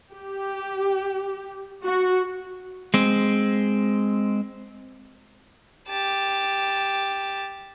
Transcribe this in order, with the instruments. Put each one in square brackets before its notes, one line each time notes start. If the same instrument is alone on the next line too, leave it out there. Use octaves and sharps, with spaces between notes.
[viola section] G4
F#4
[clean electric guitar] G#3 C4
[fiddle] G4 A5